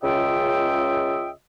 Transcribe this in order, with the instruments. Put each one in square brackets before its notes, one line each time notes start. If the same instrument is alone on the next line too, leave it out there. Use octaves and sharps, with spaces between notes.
[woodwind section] C#2 C#3 F4 D#5 E5 G5